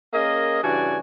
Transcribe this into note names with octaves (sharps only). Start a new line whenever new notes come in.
A#3 C#4 G#4 A#4 D#5
G2 C#3 E3 F#4 D5 G#5